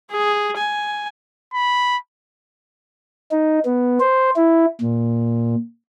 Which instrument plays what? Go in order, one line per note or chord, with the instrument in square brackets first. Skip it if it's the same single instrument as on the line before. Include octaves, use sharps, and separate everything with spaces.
[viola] G#4
G#5
[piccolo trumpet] B5
[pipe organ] D#4
B3
C5
E4
A#2